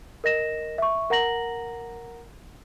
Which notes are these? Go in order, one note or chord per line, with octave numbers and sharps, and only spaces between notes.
A#4 D#5 A#6 E7
E5 C#6
A#4 F#5 A#5 A#6 F#7